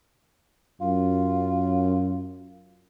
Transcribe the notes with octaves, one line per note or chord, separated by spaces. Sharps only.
F#2 F4